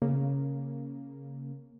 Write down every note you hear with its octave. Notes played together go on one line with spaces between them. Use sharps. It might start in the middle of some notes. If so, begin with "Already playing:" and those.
C#3 A#3